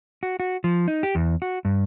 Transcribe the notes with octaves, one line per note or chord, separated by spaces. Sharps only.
F#4
F#4
F3
D#4
G4
E2
F#4
G2